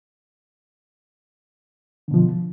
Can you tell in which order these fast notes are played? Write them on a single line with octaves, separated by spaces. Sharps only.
D3 B2 F3